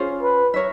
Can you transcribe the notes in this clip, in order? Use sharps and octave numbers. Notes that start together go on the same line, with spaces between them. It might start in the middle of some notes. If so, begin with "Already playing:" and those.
Already playing: C#4 F4 G#4 C5
B4
A#4 C#5 E5